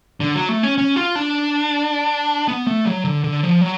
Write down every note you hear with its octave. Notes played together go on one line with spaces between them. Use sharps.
D3
F#3
A3
C#4
C#4
F4
D4
B3
A3
F#3
D3
D3
F3
F#3